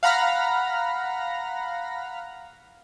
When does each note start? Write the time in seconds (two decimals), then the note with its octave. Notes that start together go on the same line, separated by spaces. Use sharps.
0.03 F5 F#5 A#5 B5 F6 A#6